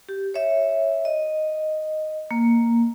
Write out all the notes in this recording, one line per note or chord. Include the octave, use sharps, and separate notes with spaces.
G4
C#5 E5
D#5
A#3